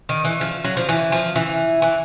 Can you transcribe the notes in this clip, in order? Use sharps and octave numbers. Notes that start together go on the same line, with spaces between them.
D#3
E3
F3
F#3
F3
E3
F3
E3
E3